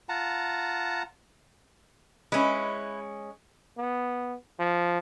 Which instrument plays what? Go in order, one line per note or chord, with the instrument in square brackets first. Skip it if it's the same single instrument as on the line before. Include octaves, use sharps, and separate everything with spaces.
[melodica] F4 F#5 A5 A#5
[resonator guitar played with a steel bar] G#3 C#4 [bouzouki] E4 B4
[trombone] B3
F3